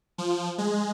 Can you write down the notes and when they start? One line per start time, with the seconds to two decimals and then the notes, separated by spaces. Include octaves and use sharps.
0.18 F3
0.58 G#3